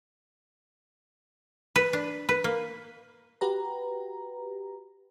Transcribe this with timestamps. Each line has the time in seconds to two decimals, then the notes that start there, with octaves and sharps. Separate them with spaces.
1.76 B4
1.93 D4
2.29 B4
2.44 A#3
3.41 F#4 G4 B4 A#5